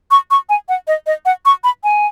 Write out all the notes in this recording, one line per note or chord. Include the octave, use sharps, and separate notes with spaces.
C#6
C#6
G#5
F#5
D#5
D#5
F#5
C#6
B5
G#5